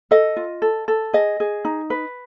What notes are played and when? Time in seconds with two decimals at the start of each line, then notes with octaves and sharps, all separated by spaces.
0.11 A4 D#5
0.36 F4
0.62 A4
0.88 A4
1.13 G#4 D#5
1.40 G#4
1.65 D#4
1.90 B4